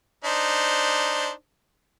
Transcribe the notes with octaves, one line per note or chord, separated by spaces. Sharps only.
D4 D#4 C5